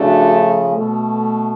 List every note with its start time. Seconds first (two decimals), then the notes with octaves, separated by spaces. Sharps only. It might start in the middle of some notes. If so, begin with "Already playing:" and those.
Already playing: C#3 F3 A3 D4 F#4
0.72 B2 A3